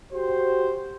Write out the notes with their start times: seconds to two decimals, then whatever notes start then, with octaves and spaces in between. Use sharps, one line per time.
0.12 F#4 G4 C5